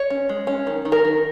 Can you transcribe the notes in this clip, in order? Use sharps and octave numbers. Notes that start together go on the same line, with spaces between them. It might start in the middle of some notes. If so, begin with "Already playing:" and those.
Already playing: C#5
C#4
G#3
C#4
D#3
D#3
A#4
D#3